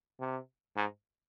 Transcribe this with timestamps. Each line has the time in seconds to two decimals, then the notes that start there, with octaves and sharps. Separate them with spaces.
0.20 C3
0.76 G#2